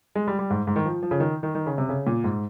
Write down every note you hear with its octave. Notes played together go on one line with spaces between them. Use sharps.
G#3
G3
G3
G#2
G#2
D#3
F3
F3
C#3
D#3
D#3
D#3
C#3
C3
C#3
A#2
G#2